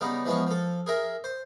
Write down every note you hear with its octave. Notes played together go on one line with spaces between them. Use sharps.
C#3 G3 B3 D#4
E3 F3 G#3 B3 C#4
F3 A4
G#4 A#4 E5
C5